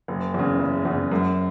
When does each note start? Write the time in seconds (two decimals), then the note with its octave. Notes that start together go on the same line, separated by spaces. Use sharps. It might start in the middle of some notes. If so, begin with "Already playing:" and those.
0.08 F#1
0.34 E2 C#3
0.60 F#1
0.85 E2 C#3
1.12 F#2